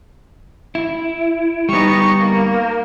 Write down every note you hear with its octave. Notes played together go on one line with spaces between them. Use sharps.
E4
G3 B3 D#4 C#6
A#3